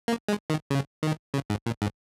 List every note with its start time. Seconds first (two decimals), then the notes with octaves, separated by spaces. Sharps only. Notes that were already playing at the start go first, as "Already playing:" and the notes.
0.08 A#3
0.28 G#3
0.50 D#3
0.71 C#3
1.03 D#3
1.34 C#3
1.50 G#2
1.66 A#2
1.82 G#2